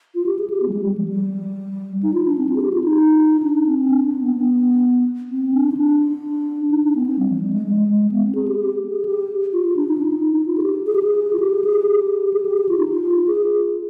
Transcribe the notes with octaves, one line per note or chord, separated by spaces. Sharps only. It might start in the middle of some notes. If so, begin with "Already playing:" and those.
F4
G4
G#4
G4
B3
G3
G#3
G3
F3
G3
D#4
F4
D4
C4
F4
G#4
G4
F4
D#4
D4
C4
D4
D4
B3
B3
C4
D4
D#4
D4
D#4
D4
B3
C4
G3
F3
G3
G#3
G#3
G#3
B3
C4
G#4
G4
G4
G#4
G4
F4
F4
D4
D#4
D4
D#4
F4
G#4
G4
G#4
G4
G#4
F4
G4
G#4
G4
G4
G#4
G4
G4
F4
D#4
F4
G#4